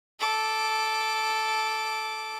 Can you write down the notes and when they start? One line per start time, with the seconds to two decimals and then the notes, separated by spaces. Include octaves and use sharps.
0.20 A4 D6